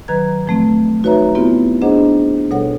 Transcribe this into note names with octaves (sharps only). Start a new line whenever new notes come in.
D#3 F#3 B4 A#5 G#6
A2 F3 A3 C4
D#4 F#4 B4 C#5 E5 A#5
B3 C4 E4 F4 G4
D4 G#4 C5 D#5 F#5 A#5
B2 G3 A4 C#5 F#5